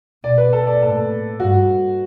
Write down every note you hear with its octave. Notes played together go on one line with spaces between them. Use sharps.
B2 D5
B4
A4
D5
A2 A4
G2 F#4